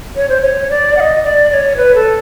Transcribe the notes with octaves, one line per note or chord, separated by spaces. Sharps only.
C#5
C5
C#5
D5
F#5
D#5
D5
D5
C#5
B4
A4